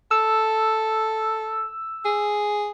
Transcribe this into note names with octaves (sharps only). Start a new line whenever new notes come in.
A4 E6
G#4